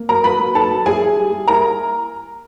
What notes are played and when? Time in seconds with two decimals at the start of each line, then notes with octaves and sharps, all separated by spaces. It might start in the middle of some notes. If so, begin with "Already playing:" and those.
Already playing: A#3
0.09 F#3 A#4 A#5
0.24 F#3 B4 B5
0.40 F#3
0.55 D#4 A4 A5
0.70 F#3
0.86 E4 G#4 G#5
1.01 E4
1.17 G3
1.32 G3
1.48 E4 A#4 A#5